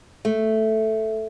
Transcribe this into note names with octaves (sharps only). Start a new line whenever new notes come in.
A3